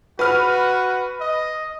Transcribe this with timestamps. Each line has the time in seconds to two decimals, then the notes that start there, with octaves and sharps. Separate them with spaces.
0.19 F#4 B4 F6
1.21 D#5